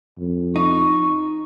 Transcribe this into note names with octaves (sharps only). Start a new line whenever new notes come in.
F2
D#4 C#6